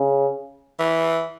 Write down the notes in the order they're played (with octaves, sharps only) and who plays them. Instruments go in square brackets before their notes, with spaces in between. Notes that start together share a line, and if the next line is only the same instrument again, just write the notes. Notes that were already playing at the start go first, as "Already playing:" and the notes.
Already playing: [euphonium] C#3
[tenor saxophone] E3